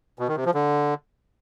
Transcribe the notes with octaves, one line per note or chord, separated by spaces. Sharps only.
B2
D#3
C3
F3
D3